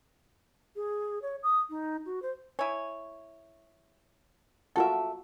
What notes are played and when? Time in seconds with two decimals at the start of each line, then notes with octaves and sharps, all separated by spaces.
0.76 G#4
1.22 C#5
1.43 D#6
1.70 D#4
2.06 F#4
2.22 C5
2.59 E4 C#5 G#5
4.76 F4 F#4 A4 A#4 E5 F#5